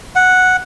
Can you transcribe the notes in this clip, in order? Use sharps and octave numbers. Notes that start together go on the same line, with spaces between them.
F#5